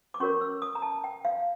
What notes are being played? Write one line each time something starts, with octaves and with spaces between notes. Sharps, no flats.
D6
C#4 F#4 A#4 C#5 C#6
E6
D#6
A#5
A5
G5
F5